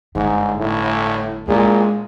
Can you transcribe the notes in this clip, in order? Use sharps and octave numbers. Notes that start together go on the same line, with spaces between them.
G1 G#2 D3
A2
A#2 G#3 D4 E4